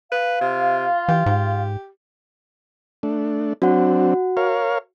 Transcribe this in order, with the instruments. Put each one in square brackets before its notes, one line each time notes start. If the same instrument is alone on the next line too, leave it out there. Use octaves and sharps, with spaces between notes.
[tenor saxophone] B4 [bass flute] F5
[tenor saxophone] C3 [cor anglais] F4
[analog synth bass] E3 [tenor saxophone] G4
[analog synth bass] G#2 [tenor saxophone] G4
[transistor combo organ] A3 D4
[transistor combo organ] F#3 C4 D4 [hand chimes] F#4 F#5
[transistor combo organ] A#4 C#5 F5